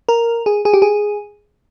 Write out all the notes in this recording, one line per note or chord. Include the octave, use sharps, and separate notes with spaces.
A#4
G#4
G#4
G4
G#4